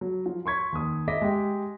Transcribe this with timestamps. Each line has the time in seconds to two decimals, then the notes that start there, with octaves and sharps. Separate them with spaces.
0.01 F#3
0.26 F3
0.46 C6 C#6 G#6 B6
0.72 D#2 D#6
1.08 D#5 E5 D6 A#6 B6
1.22 G#3 G4